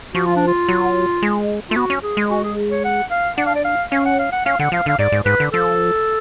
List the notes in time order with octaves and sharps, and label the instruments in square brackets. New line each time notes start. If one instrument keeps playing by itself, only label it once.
[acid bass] F3 [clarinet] F#4
[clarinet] F4
D4
F4
[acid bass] F#3
G#3
[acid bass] A3 [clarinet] F4
[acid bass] B3 [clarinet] F#4
[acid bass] C#4
[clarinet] G#4
[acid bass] G#3
[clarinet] F#4
G#4
C#5
F#5
F5
[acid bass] D4 [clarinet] F#5
[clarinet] F5
D5
F5
[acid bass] C#4 [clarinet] F5
[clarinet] F#5
F5
F#5
[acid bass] C#4 [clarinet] F5
[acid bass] D3 [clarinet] F#5
[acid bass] F3 [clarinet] F5
[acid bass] D3 [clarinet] F5
[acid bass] G#2 [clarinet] D5
[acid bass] G#2
[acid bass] G#2 [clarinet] B4
[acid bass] D3
[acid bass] F3 [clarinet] A4